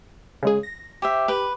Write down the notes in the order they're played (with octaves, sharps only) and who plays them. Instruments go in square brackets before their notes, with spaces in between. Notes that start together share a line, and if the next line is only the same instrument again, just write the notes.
[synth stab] C#3 G#3 G#4
A#6
[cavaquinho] G4 C5 E5
[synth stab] G4 [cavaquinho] B4